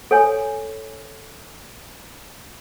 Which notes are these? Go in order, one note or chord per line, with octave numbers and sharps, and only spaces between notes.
A4 C#5 G#5